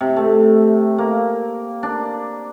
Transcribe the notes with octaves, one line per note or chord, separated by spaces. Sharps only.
C3
A3
A#3
D4